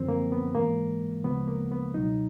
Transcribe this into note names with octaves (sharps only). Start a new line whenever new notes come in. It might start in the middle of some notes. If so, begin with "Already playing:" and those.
Already playing: F#2 D3 F3 C4
A#3
B3
G#2 E3 G#3 A#3
D2 C#3 F3 G#3 B3
A#3
B3
C#2 B2 F#3 D#4